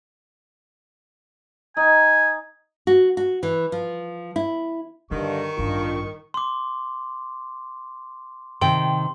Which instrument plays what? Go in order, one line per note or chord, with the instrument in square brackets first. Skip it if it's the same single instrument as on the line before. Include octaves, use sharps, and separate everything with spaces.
[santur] D#4 [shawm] G#5
[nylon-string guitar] F#4
F#4
E3
F3
E4
[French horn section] G2 D3 [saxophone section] D#3 [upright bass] D#4 [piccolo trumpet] C#6
[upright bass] A1 G2 [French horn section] D4 F4
[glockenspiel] C6 D6
[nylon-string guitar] C3 D#3 G5 [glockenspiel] C6